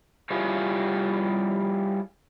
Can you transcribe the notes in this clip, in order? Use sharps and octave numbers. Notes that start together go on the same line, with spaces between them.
G3 E4 F4 G4 G#4 C#5